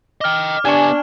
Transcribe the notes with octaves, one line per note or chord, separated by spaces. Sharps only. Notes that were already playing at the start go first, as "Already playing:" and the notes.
D#5 G5 D6 F6
B3 D4 G4 G#5 C#6 F6 E7 F#7